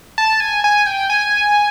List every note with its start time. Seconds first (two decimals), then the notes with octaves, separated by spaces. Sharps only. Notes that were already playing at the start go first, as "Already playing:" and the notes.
0.18 A5
0.40 G#5
0.64 G#5
0.86 G5
1.10 G#5